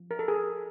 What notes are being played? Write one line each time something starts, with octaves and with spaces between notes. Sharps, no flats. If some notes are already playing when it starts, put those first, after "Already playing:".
Already playing: F3
A#4
A4
G#4 A#4